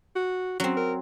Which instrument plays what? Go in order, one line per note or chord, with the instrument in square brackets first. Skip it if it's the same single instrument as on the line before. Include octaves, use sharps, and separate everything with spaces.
[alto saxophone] F#4
[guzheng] F#3 C4 [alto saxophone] C#4
[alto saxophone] A#4